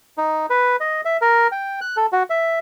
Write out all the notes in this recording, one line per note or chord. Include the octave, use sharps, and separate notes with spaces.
D#4
B4
D#5
E5
A#4
G5
F#6
A4
F#4
E5